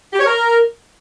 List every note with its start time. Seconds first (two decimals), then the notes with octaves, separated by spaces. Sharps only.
0.13 G4
0.19 C#5
0.26 A#4